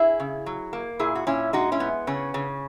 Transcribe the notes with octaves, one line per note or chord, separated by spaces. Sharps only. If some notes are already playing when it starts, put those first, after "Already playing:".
Already playing: E4 G#4
C#3
F#3
A#3
A#2 E4 G#4
F#4
A#2 C#4 E4
G#3 D#4 F#4
C#4 E4
B3
C#3 C#4
C#3